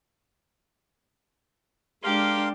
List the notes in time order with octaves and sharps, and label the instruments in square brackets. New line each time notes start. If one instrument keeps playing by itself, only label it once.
[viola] G#3 D4 [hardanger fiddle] G4 [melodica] A#4 F5 C6